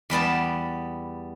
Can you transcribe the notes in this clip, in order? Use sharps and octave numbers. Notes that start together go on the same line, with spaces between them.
E2 G3 B3 A5